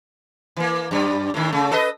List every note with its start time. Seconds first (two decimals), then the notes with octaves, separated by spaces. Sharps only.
0.57 E3 A#3
0.91 F#2 G3
1.34 A2 D#3
1.52 C#3 A3
1.72 A4 B4 D#5